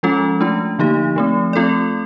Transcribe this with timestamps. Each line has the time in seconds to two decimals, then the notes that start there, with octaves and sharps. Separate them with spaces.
0.03 F3 G#3 C#4 F4 A4
0.41 A3 D4 F4
0.79 D3 F3 A#3 D#4 G4
1.16 F3 A3 C4
1.53 A3 C4 F4 A4 D5